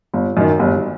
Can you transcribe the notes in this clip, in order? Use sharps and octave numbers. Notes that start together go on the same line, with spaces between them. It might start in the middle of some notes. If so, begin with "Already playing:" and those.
G1
F#2 D#3
G1